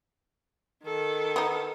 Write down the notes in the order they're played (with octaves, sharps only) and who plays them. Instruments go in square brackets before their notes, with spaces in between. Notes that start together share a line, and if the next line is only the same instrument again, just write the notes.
[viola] D#3 A4
[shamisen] B3 D#4